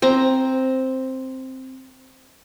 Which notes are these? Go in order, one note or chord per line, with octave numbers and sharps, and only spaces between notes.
C4 A#5